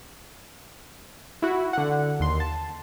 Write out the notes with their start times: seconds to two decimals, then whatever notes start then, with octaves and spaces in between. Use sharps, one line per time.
1.42 E4 F#4
1.73 D3 F#5
2.20 D#2 C6
2.40 A5